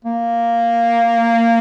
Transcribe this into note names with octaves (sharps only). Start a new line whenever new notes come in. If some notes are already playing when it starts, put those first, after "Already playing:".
A#3